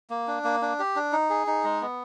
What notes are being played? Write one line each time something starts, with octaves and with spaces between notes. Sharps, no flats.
A#3
D4
A#3
D4
G4
D4
D#4
G#4
D#4
G#3
B3